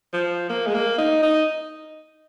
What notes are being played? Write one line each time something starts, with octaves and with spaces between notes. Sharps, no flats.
F3
A#3
G#3
A#3
D#4
D#4